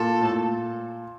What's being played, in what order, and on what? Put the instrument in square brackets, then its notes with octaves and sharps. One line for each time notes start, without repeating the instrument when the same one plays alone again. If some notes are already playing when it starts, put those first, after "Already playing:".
Already playing: [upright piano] A#2 [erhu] A4
[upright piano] A2
A#2